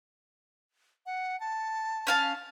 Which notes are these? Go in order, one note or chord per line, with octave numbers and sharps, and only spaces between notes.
F#5
A5
C#4 F5 A5